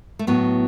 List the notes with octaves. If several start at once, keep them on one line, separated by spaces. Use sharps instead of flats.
A3
A2 F#3 B3